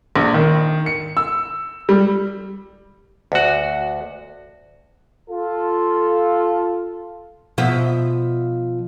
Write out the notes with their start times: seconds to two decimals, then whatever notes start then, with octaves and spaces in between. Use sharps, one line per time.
0.16 A#1
0.34 D#3
0.86 C#7
1.17 E6
1.89 G3
3.32 D2 F#4
5.30 F4 A4
7.58 B2 F3 E5